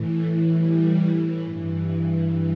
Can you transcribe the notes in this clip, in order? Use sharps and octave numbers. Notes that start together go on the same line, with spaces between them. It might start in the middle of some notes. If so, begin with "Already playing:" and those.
Already playing: A2 E3
A3
G3
G2 E3